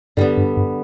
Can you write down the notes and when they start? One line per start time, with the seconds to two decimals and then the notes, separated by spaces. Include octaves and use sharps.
0.17 G2 D3 G3 B3
0.37 G2
0.57 G2